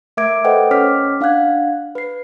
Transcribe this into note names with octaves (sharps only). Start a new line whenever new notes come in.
A3 A#4 E5 D6 G#6 D7
A4 B4 C5 D#5 F#5 G5
C#4 C#5 D6 F6 B6
D4 F5 F#5 F#6 G#6
B4 C7